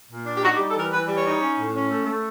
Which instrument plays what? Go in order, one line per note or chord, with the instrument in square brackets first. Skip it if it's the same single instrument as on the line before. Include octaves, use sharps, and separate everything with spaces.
[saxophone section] A#2
D4
G4
D#4 F#4
G4
G3
A4
E3 A#4
E3 B4
G3
C#5
D#4
C#4
A2
C#4
A3
A3